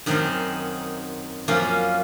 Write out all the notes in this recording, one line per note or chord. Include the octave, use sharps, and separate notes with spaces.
F#2 D#3 F#3 C4 D#4
F#2 F3 A#3 C#4